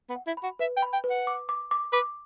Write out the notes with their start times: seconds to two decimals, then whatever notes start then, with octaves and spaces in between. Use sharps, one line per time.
0.10 B3
0.16 F#5
0.27 E4
0.37 B5
0.43 F#4
0.59 B4 E5
0.77 G5
0.82 B5
0.93 G5
1.04 B4
1.10 F#5
1.27 D6
1.49 D6
1.71 D6
1.93 B4 D6